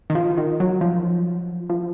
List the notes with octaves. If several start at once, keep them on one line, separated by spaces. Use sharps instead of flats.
D#3
F3
D#3
F#3
F3
F3